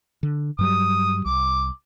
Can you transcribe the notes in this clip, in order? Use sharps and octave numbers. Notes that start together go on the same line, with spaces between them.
D3
G2 F#3 G3 D#6
C2 D6